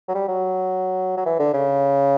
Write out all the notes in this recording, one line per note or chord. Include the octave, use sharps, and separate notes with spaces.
F#3
G3
F#3
F#3
E3
D3
C#3